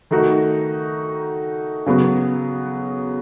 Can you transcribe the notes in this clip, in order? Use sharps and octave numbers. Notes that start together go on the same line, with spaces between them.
D#3 A3 D#4 F#4
C#3 F#3 B3 F#4